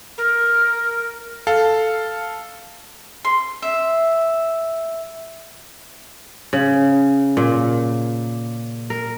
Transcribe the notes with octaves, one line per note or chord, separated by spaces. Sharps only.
A#4
A4 F5
C6
E5
C#3
A#2
A#4